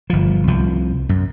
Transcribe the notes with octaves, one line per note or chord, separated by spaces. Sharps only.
G1 F3
C2 F3
F#2